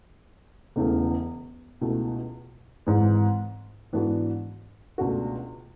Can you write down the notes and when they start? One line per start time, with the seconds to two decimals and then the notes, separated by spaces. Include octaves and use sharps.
0.76 E1 E2 C#3 E3 A3
1.81 C#2 B2 A3 E4
2.87 G#1 G#2 E3 G#3
3.93 G#2 E3 B3 D4 F#4
4.98 C#2 B2 A3 D4 F#4